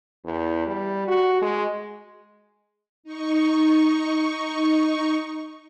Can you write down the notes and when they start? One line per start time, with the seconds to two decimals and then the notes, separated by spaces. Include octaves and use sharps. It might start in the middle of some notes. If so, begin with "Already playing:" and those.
0.25 E2
0.67 G3
1.07 F#4
1.42 G#3
3.03 D#4 C#6